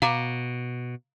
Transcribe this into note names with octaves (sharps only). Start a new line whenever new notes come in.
B2 F5 A#5 D6